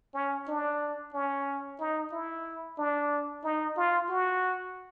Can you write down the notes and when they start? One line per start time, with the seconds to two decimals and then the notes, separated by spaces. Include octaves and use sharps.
0.14 C#4
0.48 D4
1.14 C#4
1.80 D#4
2.12 E4
2.78 D4
3.44 D#4
3.77 F4
4.09 F#4